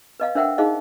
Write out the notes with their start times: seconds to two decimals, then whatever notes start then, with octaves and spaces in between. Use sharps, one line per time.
0.20 B4 D#5 F5
0.35 D4 A#4 C5 E5 F#5 G5
0.58 D#4 G#4 C5 D#5 F5